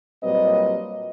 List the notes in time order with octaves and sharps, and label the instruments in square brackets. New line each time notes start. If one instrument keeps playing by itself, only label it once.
[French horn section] A#2 F#3 G3 C4 B4 D#5